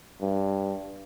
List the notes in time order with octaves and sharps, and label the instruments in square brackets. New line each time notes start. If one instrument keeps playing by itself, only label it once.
[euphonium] G2